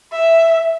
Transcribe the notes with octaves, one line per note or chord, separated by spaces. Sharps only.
E5